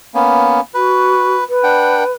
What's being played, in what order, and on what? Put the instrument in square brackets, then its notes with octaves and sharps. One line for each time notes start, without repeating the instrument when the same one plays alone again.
[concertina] A#3 B3 C#4
[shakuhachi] F#4 [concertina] B4
[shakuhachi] B4
[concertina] D4 F#5 G5